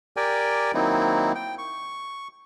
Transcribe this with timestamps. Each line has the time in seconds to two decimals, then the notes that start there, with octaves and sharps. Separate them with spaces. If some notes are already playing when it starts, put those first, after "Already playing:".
0.17 G4 A#4 D5 G5 G#5
0.74 D#3 F#3 A#3 C4 D#4 E4
1.35 G5
1.58 C#6